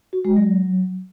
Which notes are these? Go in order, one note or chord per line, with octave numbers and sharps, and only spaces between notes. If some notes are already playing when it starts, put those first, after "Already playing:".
F#4
G#3
F#3